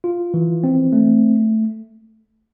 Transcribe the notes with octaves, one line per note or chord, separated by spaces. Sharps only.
F4
E3
C4
A3